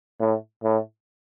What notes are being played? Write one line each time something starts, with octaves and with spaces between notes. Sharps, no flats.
A2
A2